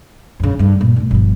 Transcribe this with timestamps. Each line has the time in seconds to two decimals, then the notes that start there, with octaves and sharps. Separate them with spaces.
0.40 F#2 C#3
0.59 G2 D3
0.80 G2 A#2
0.96 B1 A2
1.11 G1 F3